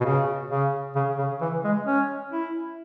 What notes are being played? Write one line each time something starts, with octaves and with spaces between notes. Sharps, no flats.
B2
C#3
C#3
C#3
C#3
E3
G#3
C#4
E4